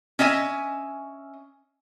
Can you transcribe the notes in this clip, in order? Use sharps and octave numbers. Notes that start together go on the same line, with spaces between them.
C#4 D#5 E5 G#5